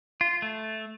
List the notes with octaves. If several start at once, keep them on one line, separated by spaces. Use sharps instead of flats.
F4
A3